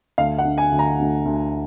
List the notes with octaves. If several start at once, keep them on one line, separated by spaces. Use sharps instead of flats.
D2 F5
F#5
D3
G#5
D2
A#5
D2
D2